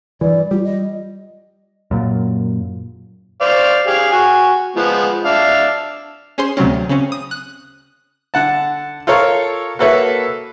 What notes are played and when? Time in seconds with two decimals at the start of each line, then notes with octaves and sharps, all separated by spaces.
0.21 G2 E3 D5
0.51 G3 F4
0.65 D#5
1.91 F#2 A#2
3.41 C5 D5 F5
3.87 G4 G#4 F5
4.12 F#4 G#5
4.76 F3 G#3 B3
5.25 D4 E5 F5
6.38 C#4 G#4 C5 C6
6.57 D2 C3 F#3 C4 C#4
6.89 C#3 C4 C#4
7.12 D#6
7.31 F#6
8.34 D3 F#5 A5
9.07 F4 A4 A#4 C#5 F5
9.79 A#3 F#4 A4 B4 C#5 E5